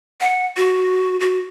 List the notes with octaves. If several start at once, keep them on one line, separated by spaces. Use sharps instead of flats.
F#5
F#4
F#4